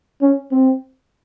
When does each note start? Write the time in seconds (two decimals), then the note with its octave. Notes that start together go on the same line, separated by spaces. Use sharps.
0.21 C#4
0.51 C4